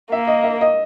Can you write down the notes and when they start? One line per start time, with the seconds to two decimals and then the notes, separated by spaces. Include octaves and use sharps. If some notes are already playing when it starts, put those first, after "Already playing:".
0.11 A#3 E5
0.27 D#5
0.44 E5
0.61 D#5